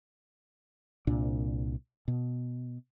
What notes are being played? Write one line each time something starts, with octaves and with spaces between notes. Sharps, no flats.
C2 A#2 D4
B2